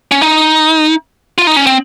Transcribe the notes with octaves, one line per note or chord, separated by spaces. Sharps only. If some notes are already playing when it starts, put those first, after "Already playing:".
C#4
D#4
F4
D#4
C#4
C4